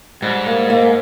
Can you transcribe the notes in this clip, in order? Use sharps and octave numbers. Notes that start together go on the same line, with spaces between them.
G#2 G3
A#3
A#3